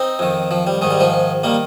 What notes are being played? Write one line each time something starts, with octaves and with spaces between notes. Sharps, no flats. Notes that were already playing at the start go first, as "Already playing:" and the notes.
Already playing: C4 D#4
F2 D#3
F3
G3
G#2 D#3 G#3
G3
F3 G#3
D#3 G3 A#3